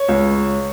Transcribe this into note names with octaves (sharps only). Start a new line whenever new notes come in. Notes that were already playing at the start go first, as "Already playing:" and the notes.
Already playing: C#5
C#2